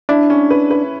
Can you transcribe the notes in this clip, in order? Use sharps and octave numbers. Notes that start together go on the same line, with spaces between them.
D4 E4
C#4
B4
B4